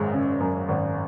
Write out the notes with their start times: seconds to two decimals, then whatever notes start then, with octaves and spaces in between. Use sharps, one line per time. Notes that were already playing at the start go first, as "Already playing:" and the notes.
Already playing: G#1 F#2 G#3
0.13 C#3
0.40 F#2
0.68 G#1